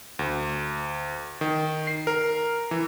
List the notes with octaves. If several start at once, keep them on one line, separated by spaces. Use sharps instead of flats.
D2
D#3
C7
A#4
E3